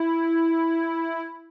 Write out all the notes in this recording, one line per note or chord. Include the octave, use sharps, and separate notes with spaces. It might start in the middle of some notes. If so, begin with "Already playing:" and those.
Already playing: E4